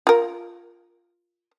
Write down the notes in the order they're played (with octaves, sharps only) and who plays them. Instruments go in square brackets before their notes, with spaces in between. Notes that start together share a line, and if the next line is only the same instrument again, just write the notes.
[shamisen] F4 A#4